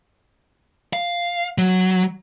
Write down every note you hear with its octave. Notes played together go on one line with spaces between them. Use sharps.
F5
F#3